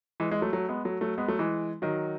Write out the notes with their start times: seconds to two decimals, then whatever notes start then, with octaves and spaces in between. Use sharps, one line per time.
0.20 E3 G#3
0.31 E3 G#3
0.42 F#3 A3
0.53 F#3 A3
0.69 G#3 B3
0.85 F#3 A3
1.01 F#3 A3
1.18 G#3 B3
1.28 F#3 A3
1.39 E3 G#3
1.82 D#3 F#3